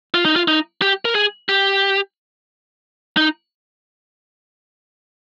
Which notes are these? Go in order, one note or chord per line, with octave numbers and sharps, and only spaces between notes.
F4
D#4
F4
D#4
G4
A#4
G#4
G4
D#4